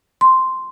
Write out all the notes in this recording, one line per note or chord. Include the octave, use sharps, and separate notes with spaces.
C6